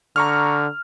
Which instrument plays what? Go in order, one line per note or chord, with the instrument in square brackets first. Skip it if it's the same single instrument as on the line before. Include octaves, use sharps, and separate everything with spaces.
[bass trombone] D3 [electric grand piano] A#5 C#6 F6